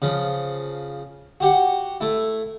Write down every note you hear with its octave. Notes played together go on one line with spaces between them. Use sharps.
C#3 F3
F#4 G4 F#5
A3 E4